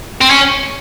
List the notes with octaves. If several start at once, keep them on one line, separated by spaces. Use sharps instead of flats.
C4
C#4